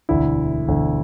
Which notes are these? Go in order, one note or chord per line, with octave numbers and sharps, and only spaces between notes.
E1 D2 D3 E4
E1 D2 D3